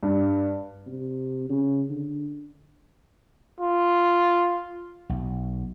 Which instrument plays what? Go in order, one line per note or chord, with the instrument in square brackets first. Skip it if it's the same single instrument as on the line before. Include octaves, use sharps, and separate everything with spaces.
[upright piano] G2
[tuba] C3
C#3
D3
[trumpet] F4
[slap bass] B1